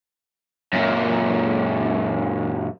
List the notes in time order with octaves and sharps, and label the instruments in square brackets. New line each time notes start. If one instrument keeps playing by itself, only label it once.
[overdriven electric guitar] F#2 A#2